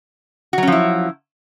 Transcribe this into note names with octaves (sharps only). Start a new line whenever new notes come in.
F3 F#3 C#4 E4 F#4